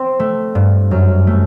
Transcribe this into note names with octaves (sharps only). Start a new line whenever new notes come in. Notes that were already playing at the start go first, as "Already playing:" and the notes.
Already playing: C4
A3
G2
F#2
A3